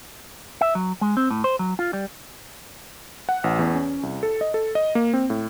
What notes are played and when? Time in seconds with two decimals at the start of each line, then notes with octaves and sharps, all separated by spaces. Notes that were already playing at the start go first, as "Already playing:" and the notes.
0.61 E5
0.75 F#3
1.01 G#3
1.17 C4
1.30 A2
1.44 C5
1.59 F#3
1.79 F4
1.93 G3
3.29 F#5
3.44 A1
3.59 E2
3.74 C#4
4.03 C2
4.23 A4
4.41 D#5
4.54 A4
4.75 D#5
4.95 A#3
5.13 C4
5.30 A2